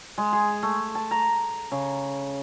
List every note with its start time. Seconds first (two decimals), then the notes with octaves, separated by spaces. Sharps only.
0.18 G#3
0.33 G#4
0.63 A3
0.95 A5
1.11 A#5
1.72 C#3